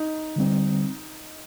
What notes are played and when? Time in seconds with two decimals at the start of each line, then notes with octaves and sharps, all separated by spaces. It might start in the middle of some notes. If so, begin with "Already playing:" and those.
Already playing: D#4
0.36 D3 G3 C4